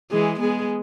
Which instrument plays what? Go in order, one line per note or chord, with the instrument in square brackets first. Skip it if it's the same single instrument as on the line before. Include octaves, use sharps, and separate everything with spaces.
[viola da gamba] E3 G#3 [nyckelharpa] G#4
[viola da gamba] G#3 B3 [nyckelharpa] G#4